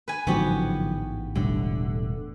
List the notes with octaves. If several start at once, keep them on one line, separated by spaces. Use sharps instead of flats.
B4 G#5
A1 G#2 D3 F3 F#3 B3 F#4 G4
E1 A2 D3 G3